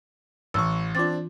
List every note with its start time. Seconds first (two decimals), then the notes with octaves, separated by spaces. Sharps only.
0.54 A1 E3 C#6 E6
0.95 C4 D4 F4 D6 A6